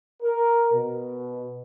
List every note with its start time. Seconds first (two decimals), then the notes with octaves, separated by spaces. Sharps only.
0.22 A#4
0.72 B2